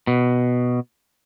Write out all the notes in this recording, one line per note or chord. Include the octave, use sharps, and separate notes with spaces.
B2